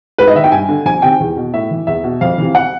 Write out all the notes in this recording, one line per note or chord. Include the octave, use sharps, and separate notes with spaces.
G#2 B4
D#5
D#3 E5
G5
G2 G#5
D3
F2 G#5
C3 D#3 G5
E2
B2
A2 E5
E3
E2 E5
B2
F2 F5
C3 E3
F#5